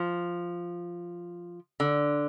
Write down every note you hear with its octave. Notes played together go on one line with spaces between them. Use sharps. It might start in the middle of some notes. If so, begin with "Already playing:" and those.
Already playing: F3
D3